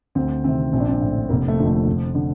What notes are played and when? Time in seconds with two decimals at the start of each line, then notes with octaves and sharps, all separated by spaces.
0.15 D2 C4
0.44 C3 D#3 C4
0.73 A#1 C4
0.80 D4
0.89 C4
1.01 A2
1.29 F1 A#3
1.48 A3
1.59 F2 D3
1.68 A3
1.87 F1
2.15 D3